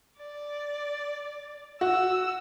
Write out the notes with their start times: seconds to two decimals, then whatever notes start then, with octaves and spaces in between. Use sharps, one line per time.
0.18 D5
1.81 F#4 E6